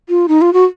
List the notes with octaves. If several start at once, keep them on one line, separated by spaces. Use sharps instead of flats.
F4
D#4
F4
F#4